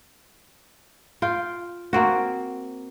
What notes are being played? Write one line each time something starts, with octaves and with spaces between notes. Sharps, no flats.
F4 G5
A#3 C4 F#4